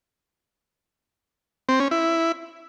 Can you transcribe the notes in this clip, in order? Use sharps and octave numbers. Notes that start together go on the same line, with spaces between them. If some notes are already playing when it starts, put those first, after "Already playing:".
C4
C#4
E4